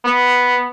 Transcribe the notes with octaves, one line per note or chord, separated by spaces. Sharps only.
B3